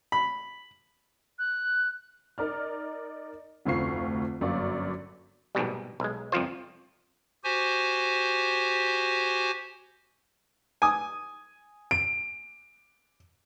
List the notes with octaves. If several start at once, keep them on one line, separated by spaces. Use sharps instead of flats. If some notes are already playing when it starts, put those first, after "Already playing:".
B5
F#6
D#4 A#4 D5 F6
F1 D2 C4 F4 C#6 C7
G1 F#2 A#3 D5 C#6
A#1 G#2 B2 G3
B1 G#3
C2 F2 F3 F4 C5
F#4 G4 C5 G#5
G#5 D#6
D7